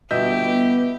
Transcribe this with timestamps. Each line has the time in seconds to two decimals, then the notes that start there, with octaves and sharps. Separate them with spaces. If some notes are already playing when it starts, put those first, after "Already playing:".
0.11 G1 B2 G4 D#5 E5 G6
0.41 B3